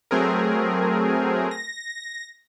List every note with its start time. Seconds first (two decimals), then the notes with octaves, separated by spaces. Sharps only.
0.11 F#3 A3 C4 G#4 A#4
1.51 A#6